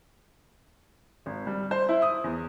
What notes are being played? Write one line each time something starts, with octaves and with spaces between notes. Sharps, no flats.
G#1
G3
C5
E4
D#6
E2